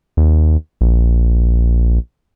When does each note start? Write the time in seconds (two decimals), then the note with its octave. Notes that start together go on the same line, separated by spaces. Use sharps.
0.17 D#2
0.81 A#1